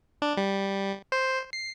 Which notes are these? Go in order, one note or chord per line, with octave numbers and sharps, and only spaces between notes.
D4
G3
C5
C7